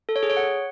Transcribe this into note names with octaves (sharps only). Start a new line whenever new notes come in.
A4
C#5
G#4
C#5
F#5